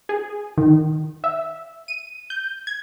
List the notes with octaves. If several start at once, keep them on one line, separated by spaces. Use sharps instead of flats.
G#4
D#3
E5
D#7
G6
G#6